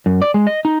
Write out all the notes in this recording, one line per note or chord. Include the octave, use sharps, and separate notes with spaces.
F#2
D5
G#3
D#5
D#4